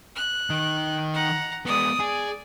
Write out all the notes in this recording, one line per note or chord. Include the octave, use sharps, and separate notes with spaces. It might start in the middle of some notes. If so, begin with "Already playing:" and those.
F#6
D#3 D#4
F#5 A#5
G#3 B3 D5 D#6
G#4 D5